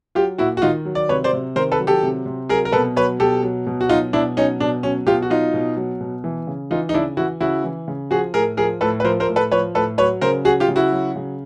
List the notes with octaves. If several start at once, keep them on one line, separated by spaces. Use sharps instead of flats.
F#3 F4 G4
A#2 E4 F#4
F#4
D#3 D#4 F4
F#3
D5
C3 B4 C#5
C5 D5
C3
D#3 A#4 C5
A4 B4
F#3
G4 A4
C3
C3
F#3 G#4 A#4
A#4
B2 A4 B4
F#3 B4 C#5
B2 G4 A4
F#3
B2
F#4
F#3 D#4 F4
B2 D4 E4
F#3 C#4 D#4
B2 D4
F#3 C#4
B2 F4 G4
F#4
F#3 D#4 F4
B2
F#3
B2
E3
C#3
E3 D#4 F4
D#4
C#3 D4 E4
E3 E4 F#4
C#3 E4 F#4
E3
C#3
F3 F#4 G#4
A2 G#4 A#4
F3 G#4 A#4
A2 A4 B4
B4
F3 A#4 C5
A#4 C5
A2
A4 B4
F3 B4 C#5
A2 A4 B4
F#3 B4 C#5
C#3 A#4 C5
F#3 F#4 G#4
F4 G4
C#3
E4 F#4
F#3
C#3